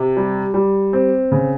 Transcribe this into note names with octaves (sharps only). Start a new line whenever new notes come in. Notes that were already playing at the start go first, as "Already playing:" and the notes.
Already playing: C3
G3
G3
C4
C#3